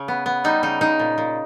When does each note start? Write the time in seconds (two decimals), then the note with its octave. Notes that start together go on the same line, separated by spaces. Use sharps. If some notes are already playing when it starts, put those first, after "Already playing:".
Already playing: C#3
0.08 B3
0.26 B3
0.44 G3 D#4
0.63 C#3 D#4
0.81 C#3 D#4
0.99 A#2
1.18 A#2